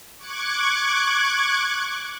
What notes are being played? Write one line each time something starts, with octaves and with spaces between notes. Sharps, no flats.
C#6 D6 F#6 G#6